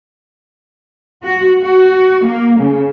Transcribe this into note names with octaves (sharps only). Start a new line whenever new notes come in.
F#4
F#4
A#3
C#3